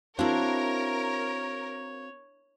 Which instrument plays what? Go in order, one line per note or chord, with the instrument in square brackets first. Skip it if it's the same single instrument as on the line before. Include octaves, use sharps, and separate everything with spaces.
[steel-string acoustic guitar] C4 F#4 F5 [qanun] D4 E4 [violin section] A#4 [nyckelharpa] C#5